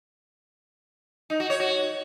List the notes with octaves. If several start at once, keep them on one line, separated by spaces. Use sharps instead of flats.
D#4
F#4
C#5
F#4